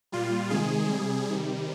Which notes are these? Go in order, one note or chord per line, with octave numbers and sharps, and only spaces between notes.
A#2 G3 F4
C3 D#3 G#3 G#4
C3 G3
C3 D#3 G3